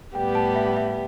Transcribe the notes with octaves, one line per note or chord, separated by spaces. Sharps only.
A2 G3 B3 G4 G5
A5
E5
E5